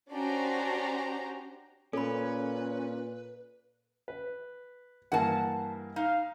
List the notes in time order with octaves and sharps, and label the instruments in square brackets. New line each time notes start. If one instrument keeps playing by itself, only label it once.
[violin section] C#4 D4 F#4 G4 C5 A#5
[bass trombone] A#2 [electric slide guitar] C#4 [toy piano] A4 B5 [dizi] B4
[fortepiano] B4
[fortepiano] G2 E3 A#3 [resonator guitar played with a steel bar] F#5 A5
[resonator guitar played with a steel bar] D#4 [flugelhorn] F5